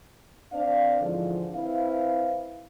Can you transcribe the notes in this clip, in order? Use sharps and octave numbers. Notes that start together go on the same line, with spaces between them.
C4 D4 C5 D5 F5
G#2 D3 E3 F3
C4 E4 B4 F5